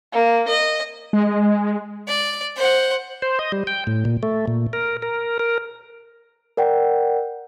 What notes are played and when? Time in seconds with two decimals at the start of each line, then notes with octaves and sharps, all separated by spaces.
0.13 A#3
0.48 D#5
1.13 G#3
2.08 D5
2.57 C5 F#5
3.22 C5
3.39 D#5
3.52 G3
3.67 G5
3.87 A2
4.05 A#2
4.23 A3
4.48 A#2
4.73 A#4
5.02 A#4
5.39 A#4
6.57 A#4 D5 F#5 G5